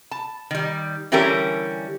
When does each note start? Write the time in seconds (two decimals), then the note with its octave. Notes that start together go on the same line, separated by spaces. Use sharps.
0.11 A5
0.51 D#3 G3
1.12 D3 E3 G3 C#4 G4 A#4